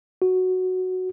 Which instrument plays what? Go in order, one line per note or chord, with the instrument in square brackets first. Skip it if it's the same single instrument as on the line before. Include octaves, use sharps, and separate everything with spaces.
[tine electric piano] F#4